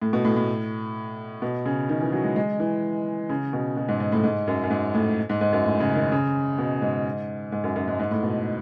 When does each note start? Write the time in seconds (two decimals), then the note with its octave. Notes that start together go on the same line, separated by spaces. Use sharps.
0.02 A2
0.13 B2
0.25 A2
0.36 A2
1.42 B2
1.66 C#3
1.89 D#3
2.01 E3
2.12 F#3
2.24 G#3
2.36 G#3
2.60 E3
3.29 C#3
3.53 B2
3.77 B2
3.89 G#2
4.00 G#2
4.12 A2
4.23 G#2
4.48 F#2
4.64 F#2
4.70 G#2
4.94 A2
5.30 G#2
5.41 G#2
5.53 F#2
5.64 A2
5.80 C#3
5.96 D#3
6.12 C#3
6.58 B2
6.82 G#2
7.52 G#2
7.64 F#2
7.76 F#2
7.88 G#2
7.99 G#2
8.11 A2
8.23 B2